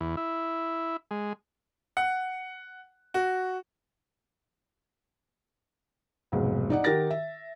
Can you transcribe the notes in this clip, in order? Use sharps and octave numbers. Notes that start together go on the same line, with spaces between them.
E2
E4
G#3
F#5
F#4
F1 B1 G#2
D#4 D5 F#5
D#3 G4 A#4 F#5 A6 A#6
E5